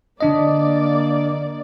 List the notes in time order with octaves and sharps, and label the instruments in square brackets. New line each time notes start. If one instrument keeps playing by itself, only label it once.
[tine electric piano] D3 D4 D#5 [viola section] A#3 D5